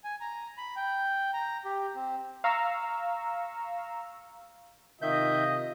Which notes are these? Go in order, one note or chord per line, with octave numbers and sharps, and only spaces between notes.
G#5
A#5
B5
G5
A#5
G4
C4
F5 A#5 C#6 E6
C3 D#3 F4 D#5 E5 G6